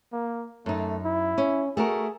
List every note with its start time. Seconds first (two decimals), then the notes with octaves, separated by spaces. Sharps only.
0.13 A#3
0.66 F#2 A3 D#4
1.05 E4
1.38 C#4
1.77 A3 F#4 G#4 A#4